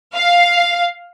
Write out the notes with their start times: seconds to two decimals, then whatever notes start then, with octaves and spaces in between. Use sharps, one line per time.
0.16 F5